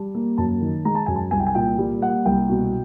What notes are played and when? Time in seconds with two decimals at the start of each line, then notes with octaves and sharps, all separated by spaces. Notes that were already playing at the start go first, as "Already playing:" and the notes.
Already playing: G3 A5
0.15 A#3
0.38 F#2 A5
0.61 D#3
0.85 G#3 A#5
0.95 A5
1.06 F#2 G#5
1.16 A5
1.31 C2 G#5
1.40 G5
1.47 G#5
1.55 A#2 G5
1.78 G3
2.02 A#3 F#5
2.25 C2 G5
2.49 B2